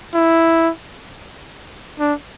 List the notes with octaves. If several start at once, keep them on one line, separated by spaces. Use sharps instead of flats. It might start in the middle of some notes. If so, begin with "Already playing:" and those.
E4
D4